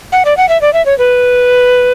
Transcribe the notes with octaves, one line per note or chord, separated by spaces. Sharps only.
F#5
D5
F#5
E5
D5
E5
C#5
B4